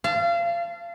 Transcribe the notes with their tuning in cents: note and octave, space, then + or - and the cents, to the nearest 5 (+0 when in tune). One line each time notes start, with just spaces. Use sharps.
F5 -30 A5 +0